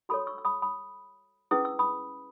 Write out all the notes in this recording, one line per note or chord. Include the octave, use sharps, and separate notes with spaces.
F#4 A4 C#5 B5 D#6
C#6 E6
E6
B5 D#6
B5 D#6
C#4 E4 G#4 B4 D#6
E6
B5 D#6